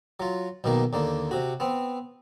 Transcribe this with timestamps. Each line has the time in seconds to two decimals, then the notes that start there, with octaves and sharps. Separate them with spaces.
0.20 F#3 F4
0.64 B1 B2 D#3 A#3 A#5
0.93 D#2 D3 A#3
1.31 C3 F#4
1.60 B3 C4